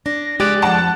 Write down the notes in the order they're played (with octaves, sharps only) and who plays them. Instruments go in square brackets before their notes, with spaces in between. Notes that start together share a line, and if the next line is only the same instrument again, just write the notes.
[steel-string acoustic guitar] D4 [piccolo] A#6
[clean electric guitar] G#3 D5 [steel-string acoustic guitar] G4 [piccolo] F#6
[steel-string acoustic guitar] F2 F3 [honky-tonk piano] F#5 A5